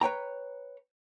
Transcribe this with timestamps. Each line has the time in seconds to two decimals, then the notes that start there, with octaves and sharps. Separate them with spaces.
0.01 B4 C#5 G5 A#5